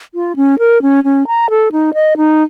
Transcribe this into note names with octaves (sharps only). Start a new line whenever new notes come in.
F4
C#4
A#4
C#4
C#4
A#5
A4
D#4
D#5
D#4